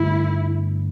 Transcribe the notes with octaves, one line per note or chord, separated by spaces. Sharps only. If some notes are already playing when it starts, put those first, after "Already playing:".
Already playing: G2 D3 A3 E4